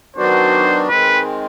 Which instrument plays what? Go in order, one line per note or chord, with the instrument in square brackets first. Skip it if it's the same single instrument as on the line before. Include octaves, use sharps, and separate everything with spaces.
[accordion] D#3 F#3 B3 D4 F#4 [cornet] C5
[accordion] D#3 G#3 C4 [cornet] B4